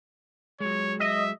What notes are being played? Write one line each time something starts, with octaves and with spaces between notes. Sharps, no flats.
F#3 G#3 C#5
D#5 E5